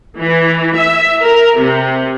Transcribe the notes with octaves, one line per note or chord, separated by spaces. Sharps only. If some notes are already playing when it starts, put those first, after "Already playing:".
E3
E5
A#4
C3